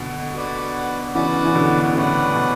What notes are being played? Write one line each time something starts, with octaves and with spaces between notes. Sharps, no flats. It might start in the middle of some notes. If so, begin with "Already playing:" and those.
Already playing: B2 D3
F#4 B4 D5 F#5
C#3 E3 F#4 B4 D5 F#5
E3
B2 D3
D3
A2 C#3 F#4 B4 D5 F#5
B2